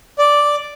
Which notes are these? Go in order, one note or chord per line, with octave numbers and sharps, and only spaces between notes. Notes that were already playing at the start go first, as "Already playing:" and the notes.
D5